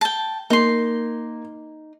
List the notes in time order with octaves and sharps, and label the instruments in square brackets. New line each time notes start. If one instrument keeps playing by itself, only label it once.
[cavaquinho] G5 A5
[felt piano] A#3 [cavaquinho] D#4 C6